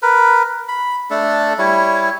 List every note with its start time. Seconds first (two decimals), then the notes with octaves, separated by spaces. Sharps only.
0.02 A#4 B4
0.68 B5
1.10 A3 D4 A4
1.59 G3 E4 C#5